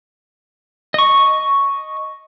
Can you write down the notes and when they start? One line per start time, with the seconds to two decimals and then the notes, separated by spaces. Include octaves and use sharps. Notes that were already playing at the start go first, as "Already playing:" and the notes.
0.94 D#5 C#6